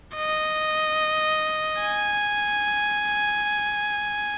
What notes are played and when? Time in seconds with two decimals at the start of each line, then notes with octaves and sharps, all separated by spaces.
0.16 D#5
1.81 G#5